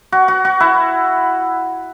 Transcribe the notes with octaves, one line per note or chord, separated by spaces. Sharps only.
F#4
F#4
F#4
E4